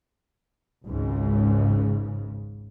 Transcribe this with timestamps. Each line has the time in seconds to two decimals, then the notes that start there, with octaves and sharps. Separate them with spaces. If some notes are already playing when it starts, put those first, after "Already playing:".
0.86 G#1 C#2 G#2 C#3